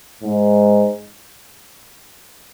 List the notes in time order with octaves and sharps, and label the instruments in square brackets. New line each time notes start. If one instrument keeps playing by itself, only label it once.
[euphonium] G#2